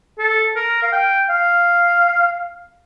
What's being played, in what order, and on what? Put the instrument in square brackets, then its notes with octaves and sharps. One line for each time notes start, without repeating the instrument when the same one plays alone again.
[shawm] A4
A#4
F5
G5
F5